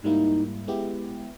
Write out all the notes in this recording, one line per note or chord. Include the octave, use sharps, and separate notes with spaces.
G#2 G3 A#3 D#4 E4
G#3 B3 E4 G4